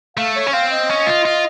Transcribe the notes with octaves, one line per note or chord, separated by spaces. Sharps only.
A3 F5
C#5
C#4
C4 F5
D#5
C#4
F4
F4